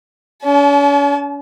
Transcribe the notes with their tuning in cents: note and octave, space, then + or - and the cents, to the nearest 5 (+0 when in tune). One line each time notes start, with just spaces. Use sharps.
C#4 +40 A5 -35